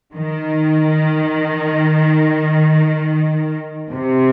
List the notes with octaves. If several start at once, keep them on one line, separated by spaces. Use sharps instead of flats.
D#3
C3